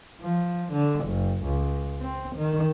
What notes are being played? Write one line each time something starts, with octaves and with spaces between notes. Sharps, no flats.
F3
D3
F#1
C#2
C4
D#3